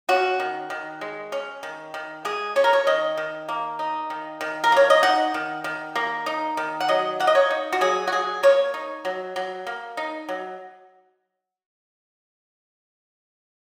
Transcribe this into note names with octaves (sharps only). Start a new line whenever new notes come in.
C#4 F#4
D#3
D#3
G#3
C#4
D#3
D#3
G#3 G#4
C#4 C#5
A#4
C#5
D#3 D#5
D#3
A#3
D#4
D#3
D#3
A#4
A#3 C#5
D#5
D#4 F#5
D#3
D#3
A#3
D#4
D#3
F#5
F#3 D#5
A#3 F#5
D#5
C#5
D#4
F#4
F#3 G#4
F#4
F#3 G#4
A#3 C#5
D#4
F#3
F#3
A#3
D#4
F#3